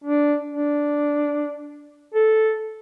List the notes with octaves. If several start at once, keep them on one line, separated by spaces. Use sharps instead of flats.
D4
D4
A4